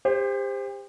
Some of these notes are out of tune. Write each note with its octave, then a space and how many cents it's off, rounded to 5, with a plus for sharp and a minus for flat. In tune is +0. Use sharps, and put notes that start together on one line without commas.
G4 +35 C5 +0